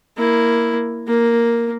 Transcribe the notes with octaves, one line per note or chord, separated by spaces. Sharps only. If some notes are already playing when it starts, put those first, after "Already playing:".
A#3 E4
A#3